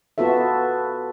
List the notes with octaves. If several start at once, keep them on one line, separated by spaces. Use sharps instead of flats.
B3 F4 F#4 A4 E5